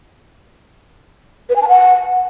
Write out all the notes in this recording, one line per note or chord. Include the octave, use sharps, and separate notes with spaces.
B4
G#5
A5
F#5